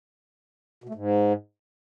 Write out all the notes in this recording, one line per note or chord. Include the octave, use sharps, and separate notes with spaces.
B2
A3
G#2